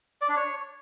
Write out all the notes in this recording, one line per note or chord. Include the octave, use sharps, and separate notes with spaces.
D5
D4
C#5